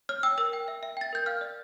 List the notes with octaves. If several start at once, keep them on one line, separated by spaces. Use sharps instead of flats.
C#5 F6
G5 E6
A#4 E6
G5
E5
E5
G5 A6
A#4 G6
F5 F6
D5